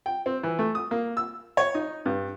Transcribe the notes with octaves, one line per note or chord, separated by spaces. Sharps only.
G5
C4
E3
A3
D#6
A#3
E6
C#5
D#4
G2